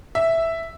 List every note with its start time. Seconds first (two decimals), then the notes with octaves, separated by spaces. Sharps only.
0.15 E5